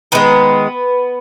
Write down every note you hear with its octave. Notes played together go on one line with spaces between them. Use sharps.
D#3 G#3 B3 B4